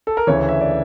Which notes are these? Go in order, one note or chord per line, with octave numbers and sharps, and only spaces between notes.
A4
A#4
D2 C#3 E3 C#5
E5
D5